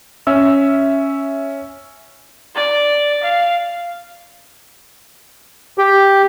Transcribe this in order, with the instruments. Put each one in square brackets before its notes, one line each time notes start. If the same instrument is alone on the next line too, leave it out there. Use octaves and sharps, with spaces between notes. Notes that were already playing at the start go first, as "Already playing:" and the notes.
[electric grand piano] C#4 E5 E6
[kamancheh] D5
F5
[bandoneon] G4